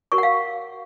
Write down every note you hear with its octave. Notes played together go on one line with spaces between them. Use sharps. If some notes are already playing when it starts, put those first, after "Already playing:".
F#4 A#4 C#5 C#6
F#5
F5